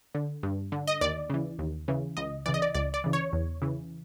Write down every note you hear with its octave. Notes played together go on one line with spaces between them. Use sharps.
D3
G2
D3
D#5
D#2 D5
C#3 E3
D#2
C#3 E3
C#2 D#5
C#3 E3 D5
D#5
D5
C#2 D5
D5
C#3 E3
C#5
E2
C#3 E3